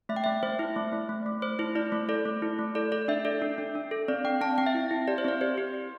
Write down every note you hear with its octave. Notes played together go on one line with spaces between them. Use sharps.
A3 E5
G5
A3 E5
A3 C5
E4
A3
A3
A3
A3
A3 C5
E4 C5
E4 D5
A3
A4 D5
A3
E4
A3
A4 D5
A4 D5
D4 E5
A4 D5
D4
D4
D4
A4
C4 D5
C4 G5
C4 A5
C4 G5
E5
E4
E4
G4 D5
C5
C4 D5
G4 C5
G4
G4